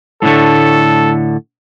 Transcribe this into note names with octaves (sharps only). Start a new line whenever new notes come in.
A2 D3 A3 A4